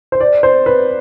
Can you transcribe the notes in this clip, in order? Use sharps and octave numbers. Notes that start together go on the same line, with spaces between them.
C5
D5
C5
B4